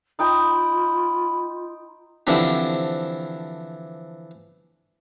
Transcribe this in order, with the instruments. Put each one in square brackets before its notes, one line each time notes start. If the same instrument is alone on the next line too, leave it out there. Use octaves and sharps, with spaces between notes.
[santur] D#4 G5 D#6 [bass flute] F4 [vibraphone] B5
[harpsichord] D3 E3 F3 C4 D4 G4